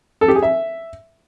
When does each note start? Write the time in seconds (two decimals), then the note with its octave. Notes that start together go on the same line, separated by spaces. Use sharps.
0.21 A4
0.28 G4
0.35 G#4
0.43 E5